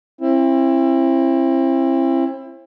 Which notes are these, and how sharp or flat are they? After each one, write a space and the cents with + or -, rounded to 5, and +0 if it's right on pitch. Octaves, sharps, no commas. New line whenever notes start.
C4 +35 E4 +20